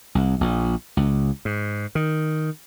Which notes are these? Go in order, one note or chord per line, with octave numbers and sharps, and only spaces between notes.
C2
A#1
C#2
G#2
D#3